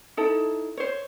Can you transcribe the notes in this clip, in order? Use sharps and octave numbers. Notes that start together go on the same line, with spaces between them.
D#4 E4 A4
C5 C#5